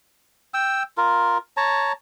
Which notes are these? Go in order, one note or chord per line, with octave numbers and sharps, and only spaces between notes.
G5 E6
F4 A#4
C#5 A5 A#5